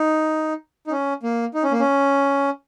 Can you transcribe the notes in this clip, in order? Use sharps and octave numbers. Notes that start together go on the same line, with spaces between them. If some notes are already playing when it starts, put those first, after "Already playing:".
Already playing: D#4
D#4
C#4
A#3
D#4
C#4
A#3
C#4